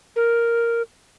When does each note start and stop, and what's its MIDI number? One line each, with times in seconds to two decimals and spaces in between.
0.16 0.82 70